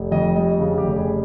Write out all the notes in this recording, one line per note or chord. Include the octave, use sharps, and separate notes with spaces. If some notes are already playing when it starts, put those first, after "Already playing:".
Already playing: F1
F2 D#5
G3 D#5
C#3
G4
F1
G#4